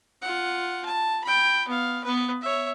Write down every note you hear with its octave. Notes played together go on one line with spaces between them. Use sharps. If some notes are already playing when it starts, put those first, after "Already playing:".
F4 F#5
A5
G5 B5
B3 F5
B3 B4
C#5 E5